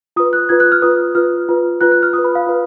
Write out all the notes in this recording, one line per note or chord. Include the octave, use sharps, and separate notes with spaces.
F4 B4 D#6
F#6
F4 B4 G#6
F#6
F6
F4 B4 D#6
F4 B4 F6
F4 B4
F4 B4 F#6
F#6
F6
F4 D#6
B4
B5
F5
F4 B4